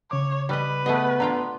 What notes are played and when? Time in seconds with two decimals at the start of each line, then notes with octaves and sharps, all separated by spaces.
0.11 C#3 C#5 D6
0.49 G3 B4 D#5
0.86 A3 B3 G#4 D#5
1.20 D3 F4 G5 A#5 C6